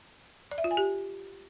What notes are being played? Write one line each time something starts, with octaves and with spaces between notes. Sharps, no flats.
D5
E5
F4
G#5
G4